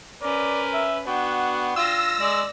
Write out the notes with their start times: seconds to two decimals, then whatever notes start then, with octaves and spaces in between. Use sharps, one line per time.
0.22 C#4 A#4 B4 D5
0.74 E5
1.07 B3 D4 F#4 G5
1.76 F4 E6 A#6
2.20 G#3 D5